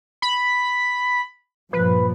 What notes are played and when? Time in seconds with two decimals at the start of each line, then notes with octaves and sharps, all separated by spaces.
0.22 B5
1.73 G2 A#2 F3 B4